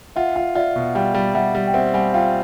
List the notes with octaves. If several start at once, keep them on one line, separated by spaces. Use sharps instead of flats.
F4 E5 F#5
F4
F4 D5 E5
B2
G3 F5 G5
G3
G3 E5 F#5
G3
G5
C4 E5 F#5
G3 F#5 G#5
F4 F5 G5